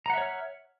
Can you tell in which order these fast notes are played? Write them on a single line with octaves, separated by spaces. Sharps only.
A#5 F#5 E5 C#5 F6